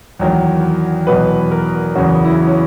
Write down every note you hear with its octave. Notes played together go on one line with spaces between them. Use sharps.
E2 D#3 F#3
E2 B2 F#3 B4
A#4
E2 C#3 F#3 F#4
E4
C#4